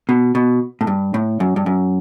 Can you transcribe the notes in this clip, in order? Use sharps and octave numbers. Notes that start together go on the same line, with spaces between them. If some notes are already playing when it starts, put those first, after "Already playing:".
B2
B2
A2
G2
A2
F#2
G2
F#2